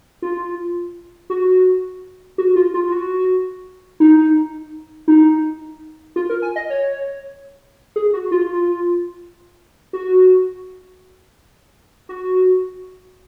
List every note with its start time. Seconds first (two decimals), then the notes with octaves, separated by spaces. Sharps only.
0.22 F4
1.30 F#4
2.38 F#4
2.56 F4
2.74 F4
2.87 F4
2.92 F#4
4.00 D#4
5.08 D#4
6.16 F4
6.29 A#4
6.42 G#5
6.56 D#5
6.70 C#5
7.96 G#4
8.13 F#4
8.31 F4
9.93 F#4
12.09 F#4